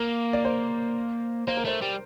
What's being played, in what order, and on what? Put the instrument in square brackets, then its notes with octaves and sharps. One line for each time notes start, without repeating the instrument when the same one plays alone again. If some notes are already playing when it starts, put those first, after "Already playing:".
Already playing: [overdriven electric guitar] A#3 [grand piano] A#4
[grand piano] D5
C5
[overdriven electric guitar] A#3 [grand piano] C5
[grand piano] A#4
[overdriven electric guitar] A3 [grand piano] C5
[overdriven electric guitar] G3